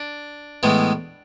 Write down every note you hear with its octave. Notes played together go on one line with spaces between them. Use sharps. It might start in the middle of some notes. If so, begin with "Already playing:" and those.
Already playing: D4
A2 E3 G#3 B3